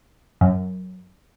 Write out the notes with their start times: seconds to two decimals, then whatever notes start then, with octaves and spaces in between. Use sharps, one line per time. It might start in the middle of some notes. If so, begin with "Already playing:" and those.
0.41 F#2